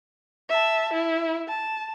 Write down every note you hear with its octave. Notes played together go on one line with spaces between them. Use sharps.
E5 A5
E4
A5